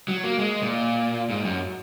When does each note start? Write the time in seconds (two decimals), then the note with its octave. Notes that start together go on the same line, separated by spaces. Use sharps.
0.08 F#3
0.24 A#3
0.39 G#3
0.62 A#2
1.30 G#2
1.45 F#2